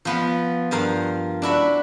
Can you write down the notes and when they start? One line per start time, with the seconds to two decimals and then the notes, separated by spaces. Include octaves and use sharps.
0.05 F3 B3 F4
0.71 G2 F3 A#4 F5
1.42 D4 E4 F#4 B5